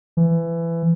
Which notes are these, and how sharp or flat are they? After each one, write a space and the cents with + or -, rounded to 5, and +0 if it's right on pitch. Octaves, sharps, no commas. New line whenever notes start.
E3 +20